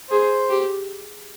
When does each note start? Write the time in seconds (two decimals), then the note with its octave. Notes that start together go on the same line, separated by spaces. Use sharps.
0.10 G#4 C5
0.50 G4